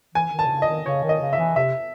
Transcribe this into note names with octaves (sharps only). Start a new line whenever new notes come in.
E3 G#5
D#3
A5
C3
C#3
D#5
D#3
C#3 C#5
D#3
D#5
C#3
E5
E3
C3 E5